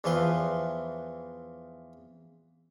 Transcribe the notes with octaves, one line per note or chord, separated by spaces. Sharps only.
E2 E3 F3 B4 C6